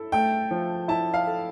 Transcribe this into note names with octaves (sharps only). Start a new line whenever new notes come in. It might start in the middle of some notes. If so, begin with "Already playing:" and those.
Already playing: E4 A4
A3 G5
F3
E4 A5
F5
A4